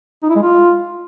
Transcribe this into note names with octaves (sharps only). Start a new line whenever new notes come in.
D#4
E4
G#3
F4